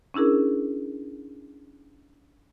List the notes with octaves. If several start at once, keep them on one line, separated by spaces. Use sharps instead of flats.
C#4 D4 E4 G#4 A#4